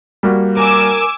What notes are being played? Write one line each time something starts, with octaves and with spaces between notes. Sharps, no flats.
G3 A#3 F#4
A#4 G#5 D6 E6